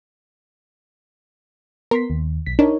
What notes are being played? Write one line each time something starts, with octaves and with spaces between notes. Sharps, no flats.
B3 A#4 C6 B6
D#2
B1 B6
D4 D#4 A#4 C#5